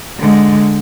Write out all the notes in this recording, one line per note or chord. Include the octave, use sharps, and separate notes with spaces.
D3 G#3